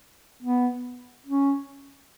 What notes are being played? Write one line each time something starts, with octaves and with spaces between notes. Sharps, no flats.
B3
C#4